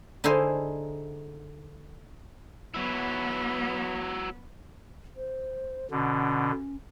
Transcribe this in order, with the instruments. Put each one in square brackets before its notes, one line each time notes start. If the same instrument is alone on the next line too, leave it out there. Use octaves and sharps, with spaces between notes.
[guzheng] D3 D#4 E4 G#4 C5
[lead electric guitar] F#3 E4 [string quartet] B3
[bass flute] C5
[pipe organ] B2 D3 [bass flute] C#4